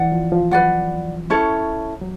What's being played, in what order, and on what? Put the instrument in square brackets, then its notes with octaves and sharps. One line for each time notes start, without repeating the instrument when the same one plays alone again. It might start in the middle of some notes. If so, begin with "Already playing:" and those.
Already playing: [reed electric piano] E3 [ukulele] D5 F#5
[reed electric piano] F3
F3
[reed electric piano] F#3 [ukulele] B4 D5 F#5
[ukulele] C#4 E4 A4 C#5
[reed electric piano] F#3